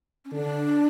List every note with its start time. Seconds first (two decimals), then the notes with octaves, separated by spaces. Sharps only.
0.25 C#4
0.31 D3 D4